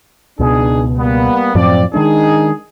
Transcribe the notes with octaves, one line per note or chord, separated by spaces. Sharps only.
C#2 B2 D4 D#4 G#4
G3 A#3 B3
F#2 A2 F3 C4 D5
D#3 G#3 D4 D#4 G#4